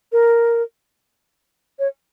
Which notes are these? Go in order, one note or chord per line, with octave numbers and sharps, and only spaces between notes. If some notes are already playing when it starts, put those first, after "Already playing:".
A#4
C#5